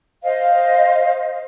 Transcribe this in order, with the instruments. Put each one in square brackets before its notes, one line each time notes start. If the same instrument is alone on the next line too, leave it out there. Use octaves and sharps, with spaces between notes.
[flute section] C5 D#5 F5